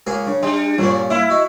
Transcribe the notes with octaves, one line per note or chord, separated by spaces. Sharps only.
C#2 A#3 G#4
C#3 D4
G3 D#4
G2 A#2 F3 C#4 F4
A#3 E4 F4
F#4 D#5